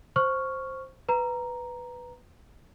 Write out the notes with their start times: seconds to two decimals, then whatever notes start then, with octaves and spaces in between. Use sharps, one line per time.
0.16 C5 C#6 F6
1.09 B4 A#5